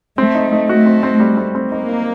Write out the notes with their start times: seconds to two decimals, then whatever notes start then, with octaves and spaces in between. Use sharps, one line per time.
0.18 A3 C4
0.35 D#4
0.52 D#4
0.69 A3 F#4
0.86 C4
1.03 C4
1.20 G3
1.37 C4
1.55 C4
1.72 A#3 D#4
1.89 D#4